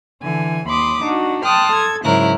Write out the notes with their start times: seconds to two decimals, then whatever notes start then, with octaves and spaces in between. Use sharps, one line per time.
0.22 D3 E3 G#5
0.69 D#2 B5 C6 D6 D#6
1.03 D4 D#4 F#4
1.43 G5 A5 C6 D#6 F6 F#6
1.74 A4 G#6
2.04 G#2 C#3 F#3 E4 A#4 F#6